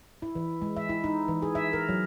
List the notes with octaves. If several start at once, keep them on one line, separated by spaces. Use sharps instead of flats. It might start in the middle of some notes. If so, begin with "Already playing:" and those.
E4
E3
G#3
E5
E4
D#4
E3
G#4
E5
A#4
F#3